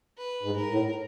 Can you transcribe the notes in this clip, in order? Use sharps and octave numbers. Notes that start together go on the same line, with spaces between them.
B4
G#2
A#4
A2